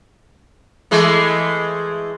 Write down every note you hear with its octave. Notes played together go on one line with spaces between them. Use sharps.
E3 G#3 A3